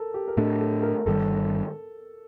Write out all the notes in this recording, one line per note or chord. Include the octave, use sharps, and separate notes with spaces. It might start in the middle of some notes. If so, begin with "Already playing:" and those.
Already playing: A4 A#4
G4
A#4
A2 A3 D4 A4
A4
A#4
G1 G2 D#3 G3 A4